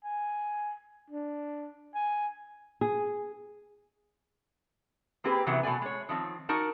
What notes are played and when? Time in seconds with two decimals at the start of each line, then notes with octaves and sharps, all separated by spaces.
0.04 G#5
1.10 D4
1.95 G#5
2.81 G#4
5.24 A#3 C4 G4 G#4 B4
5.46 C3 D#3 E3 F#3 B3
5.63 B2 A3 D5 G#5
5.82 G#3 C#5
6.09 D#3 F3 C4
6.49 D#4 F#4 A#4 D5 A5